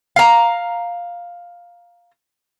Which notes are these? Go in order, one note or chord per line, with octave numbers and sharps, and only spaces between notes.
F5 A#5